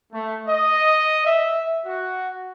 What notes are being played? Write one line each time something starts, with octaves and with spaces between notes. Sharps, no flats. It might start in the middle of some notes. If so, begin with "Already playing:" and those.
A3
D#5
E5
F#4